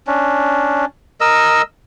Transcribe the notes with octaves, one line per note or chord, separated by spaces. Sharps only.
C#4 D4
A#4 D#5 E6